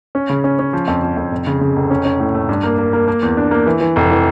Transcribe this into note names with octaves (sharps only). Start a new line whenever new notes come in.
C#4
C#3
C#4
C#4
F3
F2
F3
F2
F1
C#3
C#3
F1
C#4
C#4
A2
A3
G2
A#3
A#3
A#3
A#3
E2
D4
A#3
E3
E3
F1
E3